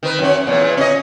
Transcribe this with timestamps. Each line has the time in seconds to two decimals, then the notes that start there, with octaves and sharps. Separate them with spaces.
0.03 D#3 B4
0.19 F#2 C#4
0.47 E2 A#2
0.77 C#4 D#5